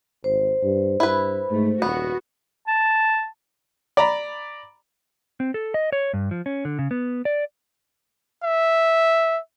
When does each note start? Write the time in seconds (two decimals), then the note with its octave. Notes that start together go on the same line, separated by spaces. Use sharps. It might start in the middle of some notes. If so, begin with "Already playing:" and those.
0.24 G#1 C5
0.63 G2
1.00 G2 E4 B4
1.51 G#2 A3
1.82 D#1 B3 F#4
2.68 A5
3.97 D5 A#5 B5
5.40 C4
5.54 A4
5.74 D#5
5.92 C#5
6.13 G2
6.31 F3
6.46 C#4
6.65 D3
6.79 C#3
6.91 B3
7.25 D5
8.44 E5